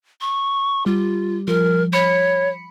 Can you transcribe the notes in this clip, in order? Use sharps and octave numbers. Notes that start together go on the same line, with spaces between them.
C#6
G3 F4
F3 A#4
C#5 B5 C#7